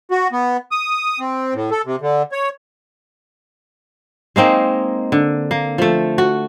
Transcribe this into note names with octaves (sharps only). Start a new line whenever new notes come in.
F#4
B3
D#6
C4
A2
A4
C3
D3
C#5
G#3 A#3 C4 D#4
D3
A#3
F3 A3
F#4